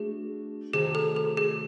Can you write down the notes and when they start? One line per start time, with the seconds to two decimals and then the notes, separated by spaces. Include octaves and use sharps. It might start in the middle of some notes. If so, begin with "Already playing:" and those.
Already playing: A3 D4 F#4 G#4
0.73 C3 D#3 F#3 A3 G#4
0.95 A4
1.16 A4
1.37 G#4